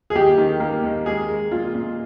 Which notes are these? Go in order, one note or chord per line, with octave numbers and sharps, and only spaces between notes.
G#4
D#2 G4
D#3
A#3
D#2
G#3 G#4
G#3
A#2 F4
A#2